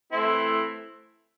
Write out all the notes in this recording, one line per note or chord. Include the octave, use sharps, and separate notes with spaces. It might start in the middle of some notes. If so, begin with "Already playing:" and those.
E3 A3 C4 E4